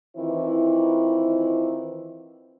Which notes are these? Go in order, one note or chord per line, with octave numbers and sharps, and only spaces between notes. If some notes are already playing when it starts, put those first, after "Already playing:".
D#3 E3 C4 E4 F4 C5